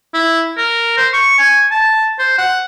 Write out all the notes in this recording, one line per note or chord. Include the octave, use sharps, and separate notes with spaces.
E4
A#4
C5
C#6
G#5
A5
C5
F#5